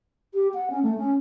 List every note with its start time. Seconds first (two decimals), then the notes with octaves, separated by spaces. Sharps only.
0.34 G4
0.54 F#5
0.70 C#4
0.83 A3
0.97 C#4